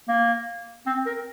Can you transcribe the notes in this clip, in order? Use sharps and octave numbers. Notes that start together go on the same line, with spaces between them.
A#3
C4
A#4